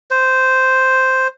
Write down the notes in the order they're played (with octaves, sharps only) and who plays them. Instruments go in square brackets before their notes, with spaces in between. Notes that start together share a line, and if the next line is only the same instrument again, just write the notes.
[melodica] C5